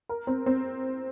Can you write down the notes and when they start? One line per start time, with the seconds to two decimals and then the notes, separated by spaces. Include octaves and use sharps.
0.09 A#4
0.27 C4
0.46 C4